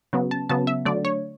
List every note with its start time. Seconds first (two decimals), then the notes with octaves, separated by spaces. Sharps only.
0.13 C#3 F#3 B3
0.31 A5
0.49 C#3 F#3 B3 A5
0.67 E5
0.85 D3 F#3 A3 D5
1.05 C#5